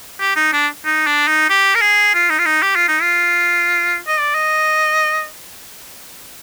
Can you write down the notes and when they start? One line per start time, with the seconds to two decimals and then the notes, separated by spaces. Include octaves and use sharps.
0.20 G4
0.36 D#4
0.53 D4
0.85 D#4
1.07 D4
1.28 D#4
1.50 G4
1.75 A#4
1.81 G#4
2.14 F4
2.30 D#4
2.39 F4
2.45 D#4
2.62 G4
2.76 F4
2.88 D#4
3.02 F4
4.07 D#5
4.20 D5
4.35 D#5